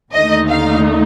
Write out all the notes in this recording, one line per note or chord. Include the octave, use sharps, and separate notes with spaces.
D#2 D3 A3 D#4 D#5
F5